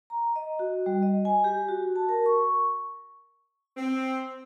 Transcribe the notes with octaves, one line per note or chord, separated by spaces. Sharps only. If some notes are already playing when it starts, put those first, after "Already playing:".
A#5
D#5
F#4
G3
D#5
G#5
G4
F#4
A5
A#4
C#6
C4